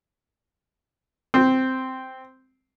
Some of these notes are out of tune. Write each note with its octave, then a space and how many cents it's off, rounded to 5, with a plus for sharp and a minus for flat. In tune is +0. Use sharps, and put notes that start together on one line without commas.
C4 -5